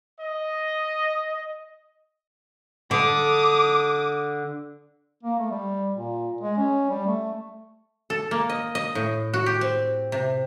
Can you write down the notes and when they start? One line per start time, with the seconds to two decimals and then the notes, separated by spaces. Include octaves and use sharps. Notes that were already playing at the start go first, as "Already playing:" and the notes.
0.21 D#5
2.91 D3 D6 D#6
5.23 A#3
5.39 A3
5.51 G3
5.94 A#2
6.41 G#3
6.57 C#4
6.90 G3
7.07 A3
8.10 A4
8.31 A#3
8.49 D#5
8.75 D#5
8.95 A2
9.34 F#4
9.46 G4
9.61 C4
10.12 C3